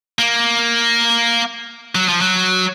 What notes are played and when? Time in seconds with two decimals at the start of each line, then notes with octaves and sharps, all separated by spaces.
0.19 A#3
1.95 F#3
2.08 F3
2.21 F#3